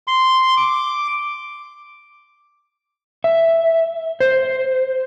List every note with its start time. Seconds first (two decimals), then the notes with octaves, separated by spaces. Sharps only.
0.07 C6
0.57 D6
3.24 E5
4.20 C5